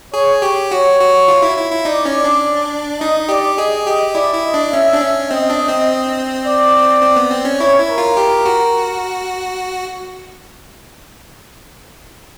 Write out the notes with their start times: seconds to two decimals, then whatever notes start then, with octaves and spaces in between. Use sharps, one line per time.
0.13 G#4 C#5
0.42 G4
0.71 F#4 C#5
1.00 F#4
1.28 F4
1.42 E4
1.57 E4
1.72 E4
1.85 D#4 D5
2.05 C#4
2.24 D4
3.01 D#4 D#5
3.29 G4 D5
3.58 G#4 D#5
3.86 G4 D#5
4.15 E4 D5
4.34 E4
4.44 D#5
4.54 D4
4.72 C#4 E5
4.93 D4
5.01 C#4
5.30 C4 D#5
5.50 D4
5.69 C4
6.45 D5
7.02 C4
7.16 B3
7.31 C4
7.45 C#4
7.60 E4 C#5
7.79 E4
7.89 A#4
7.98 F4
8.17 G4
8.45 F#4